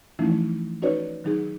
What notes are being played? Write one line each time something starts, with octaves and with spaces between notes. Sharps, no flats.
E3 F3 A3 C#4 D#4 E4
C#4 D#4 F#4 B4 C#5 D5
D#3 F#3 D#4 G#4